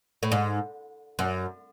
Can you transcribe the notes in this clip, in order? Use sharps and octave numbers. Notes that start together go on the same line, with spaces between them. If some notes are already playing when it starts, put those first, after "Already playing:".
A2
G#2
F#2